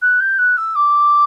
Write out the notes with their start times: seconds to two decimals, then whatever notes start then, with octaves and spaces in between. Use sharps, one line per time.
0.01 F#6
0.20 G6
0.38 F#6
0.57 E6
0.75 D6